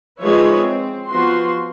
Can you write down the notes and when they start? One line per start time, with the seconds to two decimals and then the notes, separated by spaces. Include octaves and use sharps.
0.22 F3 G#3 D#4 B4 C#5 E5
0.60 C4
1.08 F3 B3 F#4 C6